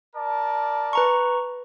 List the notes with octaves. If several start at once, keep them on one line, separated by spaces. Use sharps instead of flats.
A#4 D5 A5
B4 A#5 C#6